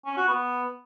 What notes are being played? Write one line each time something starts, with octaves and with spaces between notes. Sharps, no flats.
C#4
F#4
B3